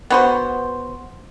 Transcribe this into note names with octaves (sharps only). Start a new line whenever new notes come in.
B3 F#4 C5